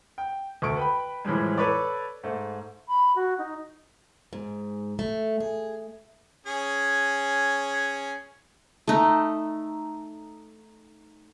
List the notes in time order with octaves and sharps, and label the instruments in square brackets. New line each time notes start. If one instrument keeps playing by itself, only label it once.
[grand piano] G5
D2 A3 C#6 D7
B4 G5 B5
A2 E3 F3 G3 G#3
A4 B4 C#5 D5
G#2 A3
[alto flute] B5
F#4
D#4
[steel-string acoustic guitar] G#2
A3
G#4
[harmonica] C#4 G#4
[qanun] A3 D#4